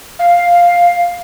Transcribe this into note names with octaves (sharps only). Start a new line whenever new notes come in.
F5